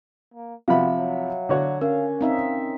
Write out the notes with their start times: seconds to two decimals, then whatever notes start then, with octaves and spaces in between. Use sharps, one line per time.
0.34 A#3
0.68 C3 F3 F#4 E5 F5 B5
0.97 F#3
1.49 D3 F#4 C#5
1.81 C#4 A#4 F5
2.21 C4 D#4 E5 F5